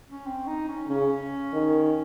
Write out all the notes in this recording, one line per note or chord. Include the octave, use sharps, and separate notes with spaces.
C#4
C4
D#4
C#4
C#3 C#4
D#3